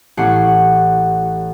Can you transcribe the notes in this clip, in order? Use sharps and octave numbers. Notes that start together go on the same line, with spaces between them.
A1 C#4 G4 F#5 C7